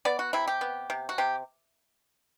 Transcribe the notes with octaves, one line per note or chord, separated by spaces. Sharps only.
B3 D5
F#4
C3 E4
G4
B3
C3
F#4
C3 G4